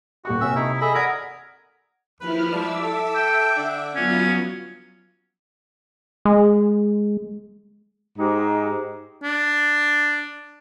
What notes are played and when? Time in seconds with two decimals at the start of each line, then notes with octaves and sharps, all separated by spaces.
0.25 D#1 F#4 G4 C#6
0.41 C3 C#4 E5 E6
0.55 A3 D#4 E4
0.81 G#4 A4 D#5 E5 B5
0.95 A#4 D5 F#5 A#5 D#6 G#6
2.20 D#2 F3 E4 B4 F6
2.52 F3 G3 G#3 E5 D6 E6
2.83 A4
3.16 G5
3.57 D3 D4
3.95 F#3 B3 C#4 F4
6.25 G#3
8.18 G#2 G#3 D#4 G4
9.23 D4